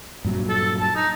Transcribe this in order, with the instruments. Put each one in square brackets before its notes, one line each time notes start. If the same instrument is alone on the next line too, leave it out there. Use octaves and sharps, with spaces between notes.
[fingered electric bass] G2 A#2 F#3
[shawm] A4
A5
D#4